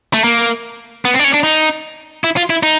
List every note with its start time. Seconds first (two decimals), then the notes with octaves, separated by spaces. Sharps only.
0.14 A3
0.24 A#3
1.05 B3
1.14 C4
1.19 D4
1.24 C#4
1.34 D4
1.44 D#4
2.24 E4
2.37 F4
2.50 E4
2.63 D#4